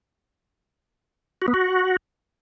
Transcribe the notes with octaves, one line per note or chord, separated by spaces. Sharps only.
F#4
B3
F#4